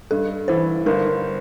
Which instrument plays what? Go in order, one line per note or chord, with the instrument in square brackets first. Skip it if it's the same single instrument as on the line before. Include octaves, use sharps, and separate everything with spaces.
[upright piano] G2 [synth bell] A4
[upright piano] E3 [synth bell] C5
[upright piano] G1 [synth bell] A#4